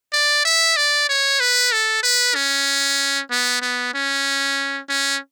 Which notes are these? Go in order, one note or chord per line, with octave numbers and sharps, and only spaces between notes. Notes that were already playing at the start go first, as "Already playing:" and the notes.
D5
E5
D5
C#5
B4
A4
B4
C#4
B3
B3
C#4
C#4